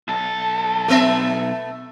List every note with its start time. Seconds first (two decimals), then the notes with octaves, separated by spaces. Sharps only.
0.08 B1 A4
0.88 A3 B3 E5